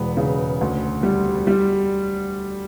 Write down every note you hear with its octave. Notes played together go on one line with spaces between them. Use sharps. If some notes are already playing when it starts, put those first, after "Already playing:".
Already playing: E1 B3
C#3
D2
G3
G3